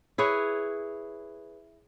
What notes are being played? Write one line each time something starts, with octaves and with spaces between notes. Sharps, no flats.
E4 G#4 B4 C#5